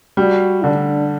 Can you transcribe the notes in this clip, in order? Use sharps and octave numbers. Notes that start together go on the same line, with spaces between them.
G3 F#4
D3 D4